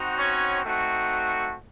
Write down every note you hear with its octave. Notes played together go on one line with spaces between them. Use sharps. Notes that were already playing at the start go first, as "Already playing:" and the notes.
Already playing: C4 D#4 F#4
C#4 C#5
A3 C4 D#4 F#4